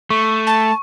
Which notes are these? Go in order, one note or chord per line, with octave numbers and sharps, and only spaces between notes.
A3 C#6
A5